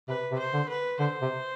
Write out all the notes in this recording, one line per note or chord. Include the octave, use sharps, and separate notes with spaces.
C3 B4
C3
C5
D3
B4
D3 C5
C3